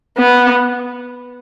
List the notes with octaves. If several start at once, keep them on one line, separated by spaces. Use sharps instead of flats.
B3